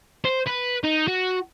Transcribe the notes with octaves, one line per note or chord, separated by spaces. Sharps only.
C5
B4
D#4
F#4